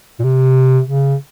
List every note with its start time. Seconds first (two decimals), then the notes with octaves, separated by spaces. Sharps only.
0.19 A#2
0.24 C3
0.87 C#3